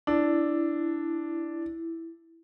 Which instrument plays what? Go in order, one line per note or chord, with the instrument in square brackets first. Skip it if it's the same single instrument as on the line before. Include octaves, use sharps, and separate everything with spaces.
[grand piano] D4 [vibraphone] E4